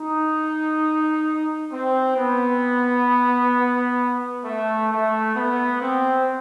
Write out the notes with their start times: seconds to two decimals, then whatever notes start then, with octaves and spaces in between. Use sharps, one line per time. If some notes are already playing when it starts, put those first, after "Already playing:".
Already playing: D#4
1.73 C4
2.17 B3
4.45 A3
4.91 A3
5.36 B3
5.81 C4